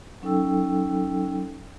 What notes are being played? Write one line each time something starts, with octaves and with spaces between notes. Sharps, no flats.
F#3 C#4 D#4 A4 G5 E6